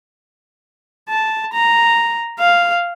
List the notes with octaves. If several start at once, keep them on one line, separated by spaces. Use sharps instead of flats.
A5
A#5
F5